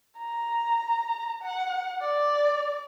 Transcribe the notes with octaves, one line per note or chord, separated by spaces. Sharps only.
A#5
F#5
D5